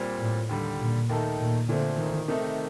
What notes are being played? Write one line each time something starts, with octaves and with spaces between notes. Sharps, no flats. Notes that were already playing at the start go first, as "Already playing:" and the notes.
Already playing: A#2 G3 C4
A2
D#2 D3 G3
A#2
D#2 D#3 A3 D#4 A4
A#2
A#2 D3 A3 C4
D#3
C3 D#3 A3 D#4